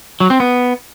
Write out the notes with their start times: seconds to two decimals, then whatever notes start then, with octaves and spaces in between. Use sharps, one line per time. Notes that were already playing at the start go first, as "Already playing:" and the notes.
0.20 F#3
0.30 C4
0.40 B3